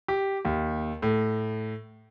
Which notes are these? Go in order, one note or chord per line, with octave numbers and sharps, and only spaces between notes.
G4
D#2
A2